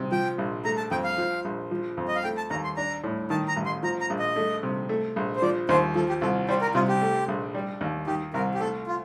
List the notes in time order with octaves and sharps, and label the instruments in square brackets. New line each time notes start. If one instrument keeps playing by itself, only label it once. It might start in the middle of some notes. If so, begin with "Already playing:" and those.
Already playing: [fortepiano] C3
[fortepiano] F3 [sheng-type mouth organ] G5
[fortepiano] A#1
[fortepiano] A3 [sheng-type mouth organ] A#5
[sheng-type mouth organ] A5
[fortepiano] F2 [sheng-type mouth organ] G5
[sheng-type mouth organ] F5
[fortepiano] F3
A#1
F3
F2
[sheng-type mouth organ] D#5
F5
[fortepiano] A3 [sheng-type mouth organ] G5
[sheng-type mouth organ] A5
[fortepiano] D#2 [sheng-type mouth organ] A#5
[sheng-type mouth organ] C6
[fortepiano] D4 [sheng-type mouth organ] A#5
[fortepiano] A2
[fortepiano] D#3 [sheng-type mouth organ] A5
[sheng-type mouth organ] A#5
[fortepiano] A1
[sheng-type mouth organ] C6
[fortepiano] F3 [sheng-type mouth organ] A#5
[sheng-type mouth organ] A#5
[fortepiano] A#1
[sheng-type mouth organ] D#5
[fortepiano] A3
C3
A3
A#1
[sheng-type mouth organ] C5
[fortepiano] F3 [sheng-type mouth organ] D5
[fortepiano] D#2 [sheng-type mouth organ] C5
[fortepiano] F3 [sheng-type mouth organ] A4
[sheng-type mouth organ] G4
[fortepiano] C2 [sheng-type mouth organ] A4
[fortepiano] G3 [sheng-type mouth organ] C5
[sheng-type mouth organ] A#4
[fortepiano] C3 [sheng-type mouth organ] F4
[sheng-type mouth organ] G4
[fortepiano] A3
A#1
G3
D#2
[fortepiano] D#3 [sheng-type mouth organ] G4
[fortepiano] C2 [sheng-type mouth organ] A#4
[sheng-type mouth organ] G4
[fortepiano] A3 [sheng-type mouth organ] A4
[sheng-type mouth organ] F4